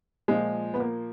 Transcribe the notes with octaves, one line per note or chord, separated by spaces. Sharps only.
A#2 F3 G#3
B3
A#3